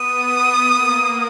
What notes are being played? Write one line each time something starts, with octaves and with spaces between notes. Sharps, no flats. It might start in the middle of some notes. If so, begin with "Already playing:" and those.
Already playing: B3 D#6
A#3